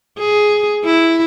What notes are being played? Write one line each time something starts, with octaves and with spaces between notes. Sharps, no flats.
G#4
E4